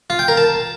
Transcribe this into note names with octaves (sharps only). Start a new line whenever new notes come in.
F4
G5
A#4
A5